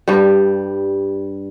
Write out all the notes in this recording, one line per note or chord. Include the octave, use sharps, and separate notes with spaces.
G2 G3